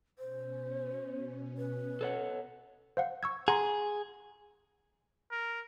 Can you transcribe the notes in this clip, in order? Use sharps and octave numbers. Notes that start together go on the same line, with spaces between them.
B2 C#4 C5
B4
A4 C#5 F#5
C5 F5 F#5
C#6 E6 G#6
G#4 F#5 A#5 C6
A#4